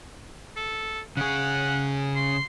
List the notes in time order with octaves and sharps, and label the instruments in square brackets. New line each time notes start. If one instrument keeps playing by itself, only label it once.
[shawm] A4
[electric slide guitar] C#3 G#4 [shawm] F#5
[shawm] C6